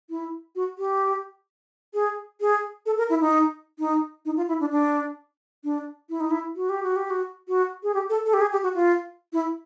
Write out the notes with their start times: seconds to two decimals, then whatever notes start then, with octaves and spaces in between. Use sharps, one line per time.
0.10 E4
0.56 F#4
0.78 G4
1.94 G#4
2.41 G#4
2.86 A4
2.98 A#4
3.10 E4
3.21 D#4
3.79 D#4
4.25 D#4
4.37 F4
4.48 E4
4.60 D4
4.72 D4
5.64 D4
6.10 E4
6.20 D#4
6.31 E4
6.56 F#4
6.69 G4
6.83 F#4
6.96 G4
7.10 F#4
7.48 F#4
7.83 G#4
7.94 G4
8.10 A4
8.25 A4
8.34 G4
8.41 G#4
8.52 G4
8.63 F#4
8.75 F4
9.33 E4